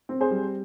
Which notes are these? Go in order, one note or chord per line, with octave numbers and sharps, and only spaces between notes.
C4
G#4 C5
G3